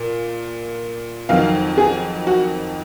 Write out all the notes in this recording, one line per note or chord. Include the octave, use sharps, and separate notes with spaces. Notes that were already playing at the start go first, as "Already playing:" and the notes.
Already playing: A#2
F2 D#3 F#3 F5
G#4
F#4